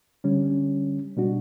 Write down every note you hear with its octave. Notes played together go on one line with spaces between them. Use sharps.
D3 G3 C#4
B2 G3 D4 F#4